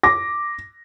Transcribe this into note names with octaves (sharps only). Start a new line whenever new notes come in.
D6 A#6